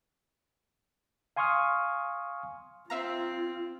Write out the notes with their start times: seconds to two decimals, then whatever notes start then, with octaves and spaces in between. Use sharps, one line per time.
1.36 F5 G#5 C6 C#6 D#6 F6
2.90 C4 F4 E5 F5 A#5